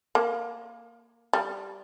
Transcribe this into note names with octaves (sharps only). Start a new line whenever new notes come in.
A#3
G3